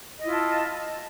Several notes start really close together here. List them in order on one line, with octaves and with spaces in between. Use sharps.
D#5 E4 F4 A5